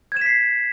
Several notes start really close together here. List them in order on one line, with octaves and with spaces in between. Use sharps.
G#6 E7 B6 C7